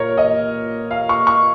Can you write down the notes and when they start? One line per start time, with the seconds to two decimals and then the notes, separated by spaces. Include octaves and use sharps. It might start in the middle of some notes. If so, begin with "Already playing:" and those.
Already playing: A#2 A#3 A#4 C#5
0.17 D#5
0.91 F5
1.09 C#6
1.27 C#6